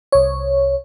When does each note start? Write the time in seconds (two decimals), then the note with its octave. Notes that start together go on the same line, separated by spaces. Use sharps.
0.12 C2 C#5